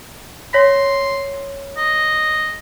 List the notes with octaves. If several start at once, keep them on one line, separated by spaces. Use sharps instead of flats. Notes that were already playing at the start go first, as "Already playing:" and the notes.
C#5 C6 A#6 B6
D#5